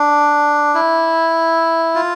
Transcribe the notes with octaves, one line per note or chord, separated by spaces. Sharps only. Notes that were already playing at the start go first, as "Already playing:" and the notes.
Already playing: D4
E4
F4